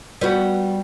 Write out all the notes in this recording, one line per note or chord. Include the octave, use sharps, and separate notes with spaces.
G3 B3 F#4